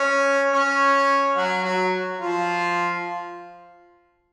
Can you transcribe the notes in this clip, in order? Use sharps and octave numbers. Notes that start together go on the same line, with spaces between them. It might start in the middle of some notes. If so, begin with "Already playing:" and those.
Already playing: C#4 C#5
C#4 C#5
F#3 F#4
F#3 F#4
F3 F4